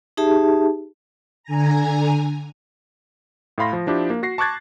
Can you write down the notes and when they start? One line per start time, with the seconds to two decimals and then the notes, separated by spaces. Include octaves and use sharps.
0.17 D#4 G4 G#4 E5 A5
1.44 D3 G#5 A#5
3.58 A2 A3 F5 B5 C6 A#6
3.73 F3
3.87 F3 D4 E4 G4
4.10 A#3
4.23 F#4 A#6 C7
4.38 A5 C#6 D6 F#6 G#6 A6